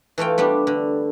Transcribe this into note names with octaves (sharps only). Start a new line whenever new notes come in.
E3 A3 F4 G5
G3 B3 D4 G4
D3